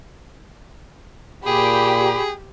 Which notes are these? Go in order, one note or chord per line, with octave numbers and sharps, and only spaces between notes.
A#2 G4 G#4 B5